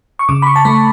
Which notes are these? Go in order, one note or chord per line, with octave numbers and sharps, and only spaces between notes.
C#6
C#3 D6
B5
C#6
A5
A3 B5